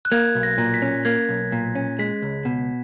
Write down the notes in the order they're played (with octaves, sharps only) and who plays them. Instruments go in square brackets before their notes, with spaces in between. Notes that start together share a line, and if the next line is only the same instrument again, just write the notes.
[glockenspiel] F#6
[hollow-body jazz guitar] A#3 [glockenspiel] G#6
[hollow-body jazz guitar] B1
[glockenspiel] A#6
[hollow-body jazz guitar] A#2
[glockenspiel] B6
[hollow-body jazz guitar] C#4
[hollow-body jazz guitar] A#3 [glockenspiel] G#6
[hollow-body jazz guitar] B1
A#2
C#4
[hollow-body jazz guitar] G#3 [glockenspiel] B6
[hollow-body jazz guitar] C#2
B2